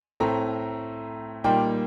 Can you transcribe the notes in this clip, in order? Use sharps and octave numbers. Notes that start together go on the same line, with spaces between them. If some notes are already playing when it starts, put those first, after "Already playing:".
A2 A3 C4 A#5
A#2 G3 A#3 D#4 G5